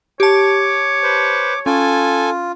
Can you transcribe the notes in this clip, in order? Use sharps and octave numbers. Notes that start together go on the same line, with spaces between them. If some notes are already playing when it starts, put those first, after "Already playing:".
G4 C#5 A5 D6
B4 C5
C#4 F4 A4 G#5